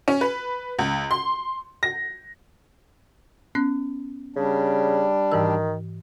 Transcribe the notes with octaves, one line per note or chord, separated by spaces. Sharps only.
C#4
B4
C#2
C6
A#6
B3 C#4 F#6
C#3 G3 D4
G#2 D#3 E3 E6